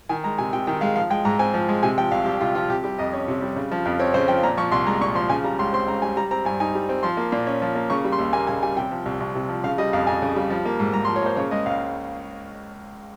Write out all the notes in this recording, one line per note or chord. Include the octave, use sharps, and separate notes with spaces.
D#3 G#5
G#3 A#5
C3 G#5
C3 G5
D#3 G5
G#3 F5
F3 F5
G#3 G5
G#2 A#5
C4 G#5
F3
G#3
C3 G#5
F3 G5
C2 F5
C2 G4
C3 F4
F3 F4
C3 G4
G3 G4
F2 D#5
C#4
C3
G3
C#3
F3
F2
C4 C#5
C#3 C5
F3 G5
A#2 A#5
F3 C#6
C2 C6
G#3 A#5
A#2 C#6
F3 C6
C#3 G#5
G3 A#5
C#2 C6
C4 C6
C#3 A#5
G3 G#5
G3 A#5
C4 A#5
G2 G#5
D#4 G#5
G3
C4
F3 C6
A#3
A#2
C#4
F3
A#3
C#3 C#6
G3
C6
D#2
A#3 G#5
C#3 G#5
G3 G#5
C3 G5
F3
C2
C2
C3
F3
C#3 F5
G3 D#5
F2 F5
F2 G#5
C#3
G3
F3
A#3
G#2
G#2 A#5
C6
F3
C#5
A#3 C5
C#3 C#5
G#3 D#5
C#2 F5